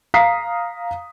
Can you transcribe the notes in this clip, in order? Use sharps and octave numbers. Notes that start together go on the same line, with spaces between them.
F5 A#5 D#6 B6 C7